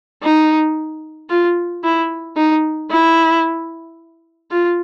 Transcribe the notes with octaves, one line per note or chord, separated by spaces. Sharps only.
D#4
F4
E4
D#4
E4
F4